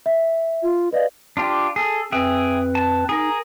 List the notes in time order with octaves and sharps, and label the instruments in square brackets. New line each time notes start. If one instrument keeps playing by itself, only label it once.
[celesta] E5
[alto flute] F4
[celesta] B4 D5 F5 [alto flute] D#5
[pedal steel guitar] D4 F4 G4
G#4 A4
[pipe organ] F2 C4 B4 [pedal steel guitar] G#4 E5 G5
[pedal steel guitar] A5
[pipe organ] D#4 [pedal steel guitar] G#4 A#4